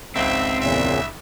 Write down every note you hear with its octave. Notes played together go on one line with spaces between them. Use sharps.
G#1 C#2 C4 E5
E2 A#2 C#3 E5